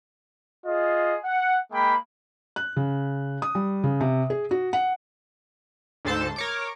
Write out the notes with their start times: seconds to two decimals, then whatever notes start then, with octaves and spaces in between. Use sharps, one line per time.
0.66 F4 G#4 D#5
1.24 F#5
1.72 G#3 A#3 G5 B5
2.56 F#6
2.76 C#3
3.42 D#6
3.55 G3
3.84 C#3
4.01 C3
4.30 G#4
4.51 F#4
4.73 F#5
6.05 D2 G#2 A4 C5 A5
6.36 A#4 C#5 D6